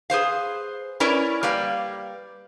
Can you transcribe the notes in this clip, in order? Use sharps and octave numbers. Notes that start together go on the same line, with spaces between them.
G#4 B4 C5 F5
C#4 E4 A#4 B4 C#5 D5
G3 A#3 B4 F5